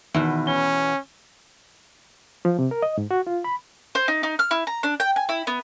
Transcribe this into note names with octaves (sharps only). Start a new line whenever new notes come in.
E2 B2 D#3
C#4 G7
F3
C3
A#4
D#5
G#2
F#4
F4
B5
C5
D#4
D#4
F6
E4
A#5
D4
G5
G#5
E4
B3